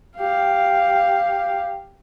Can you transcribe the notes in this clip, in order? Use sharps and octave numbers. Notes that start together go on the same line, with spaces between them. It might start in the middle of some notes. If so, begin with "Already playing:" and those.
G4 F5